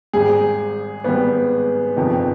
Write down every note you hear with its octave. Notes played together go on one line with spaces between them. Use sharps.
G#1 G#2 G3 G#4
G#1 G#2 G3 B3
G1 F2 C3 D#3